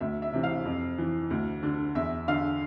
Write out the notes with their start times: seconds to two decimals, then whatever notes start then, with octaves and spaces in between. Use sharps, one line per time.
0.01 D2 E5
0.22 E5
0.33 C3 E3
0.43 F5
0.65 F2
0.98 E3
1.30 D2
1.63 D3
1.95 E2 E5
2.28 D3 F5